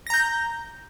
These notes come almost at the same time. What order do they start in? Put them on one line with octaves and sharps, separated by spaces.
A#6 A#5 G6